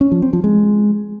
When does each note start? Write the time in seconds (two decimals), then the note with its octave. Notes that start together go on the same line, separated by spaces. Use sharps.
0.01 C#4
0.12 F3
0.22 C4
0.33 F3
0.44 G#3